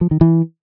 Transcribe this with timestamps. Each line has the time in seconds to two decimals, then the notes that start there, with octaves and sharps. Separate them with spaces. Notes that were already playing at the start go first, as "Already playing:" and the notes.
0.01 F3
0.11 D#3
0.21 E3